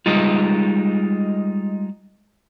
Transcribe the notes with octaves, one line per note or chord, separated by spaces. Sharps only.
G3 G#3 D#4 F4